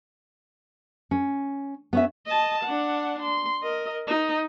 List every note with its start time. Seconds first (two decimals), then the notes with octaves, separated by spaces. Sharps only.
1.11 C#4
1.93 B3 C#4 E5
2.26 D#5 A5
2.64 D4 F#5
3.22 C6
3.63 A#4 D#5
4.07 D#4